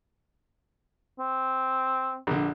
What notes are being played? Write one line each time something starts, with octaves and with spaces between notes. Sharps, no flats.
C4
A#1 D3